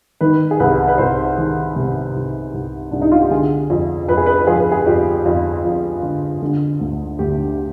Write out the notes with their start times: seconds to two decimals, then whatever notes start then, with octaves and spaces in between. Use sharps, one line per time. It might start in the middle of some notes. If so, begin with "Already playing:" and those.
0.21 D#3 B4
0.51 G#4
0.59 C2 B4
0.88 B4
0.98 C2 C5
1.38 D#3
1.76 C3
2.15 C2
2.54 C2
2.91 C2 D4
3.02 D#4
3.12 F4
3.21 G4
3.31 D3 G#4
3.70 F2
4.08 F2 B4
4.17 G#4
4.26 B4
4.47 F3 G#4
4.60 B4
4.72 G#4
4.86 F2 G4
5.25 F2 F4
5.64 F2
6.03 D3
6.42 D3
6.80 D2
7.19 D2 G4